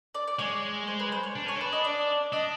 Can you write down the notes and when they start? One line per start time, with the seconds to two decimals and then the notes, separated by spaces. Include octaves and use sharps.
0.14 D5
0.27 D5
0.39 G#3 C#5
0.88 C5
1.00 B4
1.12 C5
1.23 C#5
1.36 D4
1.46 C#4 C#5
1.55 D4
1.61 B4
1.73 D#5
1.84 D5
2.33 D4 D#5